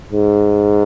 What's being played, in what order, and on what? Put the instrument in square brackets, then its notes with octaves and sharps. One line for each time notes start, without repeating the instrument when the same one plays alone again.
[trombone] G#2